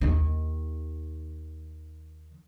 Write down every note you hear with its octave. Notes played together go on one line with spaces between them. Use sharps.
D#2 D#3